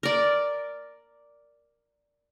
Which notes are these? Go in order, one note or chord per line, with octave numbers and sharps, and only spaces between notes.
A#4 D5